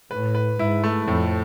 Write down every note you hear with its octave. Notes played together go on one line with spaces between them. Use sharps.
A2 B4
B4
G#2 E4
A3
F2 A2